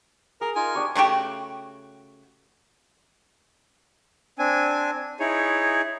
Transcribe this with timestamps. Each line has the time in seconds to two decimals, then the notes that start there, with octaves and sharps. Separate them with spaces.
0.41 G#4 A#4
0.56 D#4 F4 A#4 G#5
0.75 D4 G4 C#6
0.95 C#3 A3 F#4 G4
4.39 C4 D4 G#5
5.20 D#4 E4 G#4 C#5